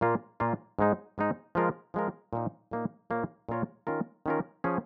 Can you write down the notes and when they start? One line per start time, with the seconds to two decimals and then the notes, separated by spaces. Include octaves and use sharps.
0.01 A#2 A#3 F4
0.40 A#2 A#3 F4
0.79 G#2 G#3 D#4
1.18 G#2 G#3 D#4
1.55 F3 G#3 F4 A#4
1.94 F3 G#3 F4 A#4
2.33 A#2 A#3 D#4
2.71 A#2 A#3 D#4
3.10 A#2 A#3 F4 A#4 C#5
3.49 A#2 A#3 F4 A#4 C#5
3.87 D#3 C#4 F4 A#4
4.26 D#3 C#4 F4 A#4
4.64 F3 C#4 G#4